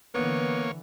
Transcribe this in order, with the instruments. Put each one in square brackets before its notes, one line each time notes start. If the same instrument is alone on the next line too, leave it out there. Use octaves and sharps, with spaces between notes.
[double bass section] D3 E3 [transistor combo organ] A#3 C#5 [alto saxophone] B3